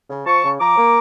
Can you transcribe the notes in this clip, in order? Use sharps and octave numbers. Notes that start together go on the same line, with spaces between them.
C#3
F3 A5 C#6
C#3
F3 A#5 D6
A#3